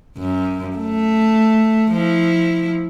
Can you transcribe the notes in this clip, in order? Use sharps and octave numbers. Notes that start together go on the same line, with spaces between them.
F#2
A3
F3 E4